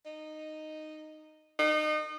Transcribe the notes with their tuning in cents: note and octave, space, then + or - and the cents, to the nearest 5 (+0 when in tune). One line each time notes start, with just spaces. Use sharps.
D#4 -10
D#4 -30